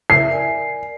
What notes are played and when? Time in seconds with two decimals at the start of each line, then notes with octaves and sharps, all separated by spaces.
0.10 E4 E5 C7
0.29 A#4 D5 G#5